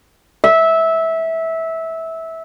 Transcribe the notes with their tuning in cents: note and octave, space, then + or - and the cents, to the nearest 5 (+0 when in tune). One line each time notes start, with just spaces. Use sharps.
E5 -15